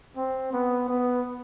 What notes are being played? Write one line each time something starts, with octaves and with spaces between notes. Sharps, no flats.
C4
B3
B3